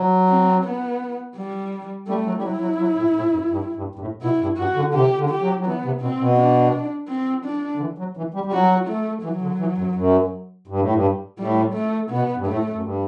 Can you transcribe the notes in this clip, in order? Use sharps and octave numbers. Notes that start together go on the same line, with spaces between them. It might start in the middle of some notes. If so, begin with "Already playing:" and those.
Already playing: F#3
C4
B3
G3
G3 A3
F#3
G3
F#3 E4
F#3
F#3
A2
A2
F#2
G2
G2
G2
A2
B2 E4
G2
G2 F#4
D3
D3
C3 G4
D3
G4
F#3
F#3
E3 B3
C3
B2 C4
B2
D4
C4
D4
D3
E3
F#3
E3
G3
G3
F#3 F#4
A3
E3 F#3
D3
E3
F#2
F#2
G2
A2
G2
A2 G3
A3
B2 B3
G2
A2 A3
F#2
G2